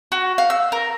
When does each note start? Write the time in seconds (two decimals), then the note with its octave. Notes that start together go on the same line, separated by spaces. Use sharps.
0.12 F#4
0.38 F5
0.50 E6
0.72 A#4